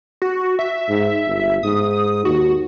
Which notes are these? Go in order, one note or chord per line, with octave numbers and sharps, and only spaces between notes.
F#4
E5
G#2
G1
G#2 D#6
D#2 F#4